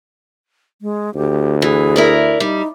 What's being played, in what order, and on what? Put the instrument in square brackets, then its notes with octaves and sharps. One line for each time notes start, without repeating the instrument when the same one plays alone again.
[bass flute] G#3
[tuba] D2 [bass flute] G4
[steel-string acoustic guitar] E3 [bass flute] G#4
[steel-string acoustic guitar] E4 A#4 D5
[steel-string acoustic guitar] G3 [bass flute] D#4